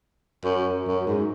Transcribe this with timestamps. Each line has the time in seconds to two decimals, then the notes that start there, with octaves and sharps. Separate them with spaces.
0.44 F#2
0.87 F#2
1.07 G#2